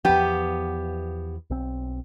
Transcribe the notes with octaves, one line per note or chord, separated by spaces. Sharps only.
E2 F3 B3 G4
B1 C4